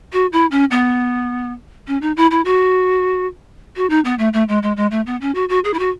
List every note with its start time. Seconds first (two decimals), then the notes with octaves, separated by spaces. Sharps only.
0.13 F#4
0.32 E4
0.51 C#4
0.71 B3
1.88 C#4
2.02 D#4
2.17 E4
2.31 E4
2.45 F#4
3.76 F#4
3.90 D#4
4.05 B3
4.19 A3
4.33 A3
4.49 G#3
4.63 G#3
4.77 G#3
4.91 A3
5.06 B3
5.21 C#4
5.35 F#4
5.49 F#4
5.64 G#4
5.74 E4
5.79 F#4